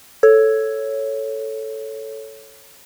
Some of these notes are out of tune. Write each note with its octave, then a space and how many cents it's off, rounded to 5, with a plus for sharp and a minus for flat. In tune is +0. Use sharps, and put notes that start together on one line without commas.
A4 +0 C#5 +0